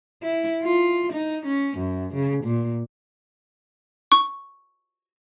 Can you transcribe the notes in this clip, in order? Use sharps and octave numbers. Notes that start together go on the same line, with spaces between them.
E4
F4
D#4
C#4
F#2
C#3
A#2
C#6